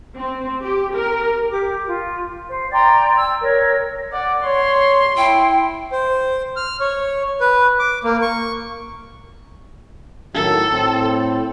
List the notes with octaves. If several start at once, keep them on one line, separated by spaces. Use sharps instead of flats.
C4
G4
A#4
G4 D6
F4
C5
D5 G5 A#5 C6
E6 G#6
A#4 C#5
D5 F#5
C#5 C6
E4 G5
C5
F6
C#5
B4
D6
A#3
C#6
A2 D#3 F#3 A4
A2 C4